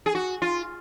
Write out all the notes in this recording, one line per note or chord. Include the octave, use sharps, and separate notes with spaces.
G#4
F#4
F4